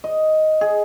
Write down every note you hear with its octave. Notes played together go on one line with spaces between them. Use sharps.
D#5
G#4